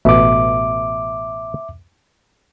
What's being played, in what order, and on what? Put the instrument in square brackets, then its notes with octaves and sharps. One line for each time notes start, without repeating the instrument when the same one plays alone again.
[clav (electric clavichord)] A1 B2 [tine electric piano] E5 D6